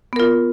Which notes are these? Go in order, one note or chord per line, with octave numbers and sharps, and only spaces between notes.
B3 F4 A#4